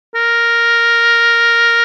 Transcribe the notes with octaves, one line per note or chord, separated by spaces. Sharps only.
A#4